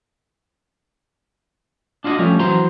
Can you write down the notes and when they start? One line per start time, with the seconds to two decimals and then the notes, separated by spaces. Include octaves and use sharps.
2.04 D4 F4 F#4 C5 D#5
2.19 F3 G3 A3 C#4
2.39 E3 F#3 C5 A#5 C6